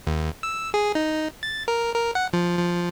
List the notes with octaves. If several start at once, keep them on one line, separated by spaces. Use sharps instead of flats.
D#2
E6
G#4
D#4
A6
A#4
A#4
F#5
F3
F3